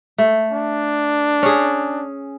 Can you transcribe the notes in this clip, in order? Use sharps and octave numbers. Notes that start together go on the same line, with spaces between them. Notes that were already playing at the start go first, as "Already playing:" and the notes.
A3
D4
C#4 G#4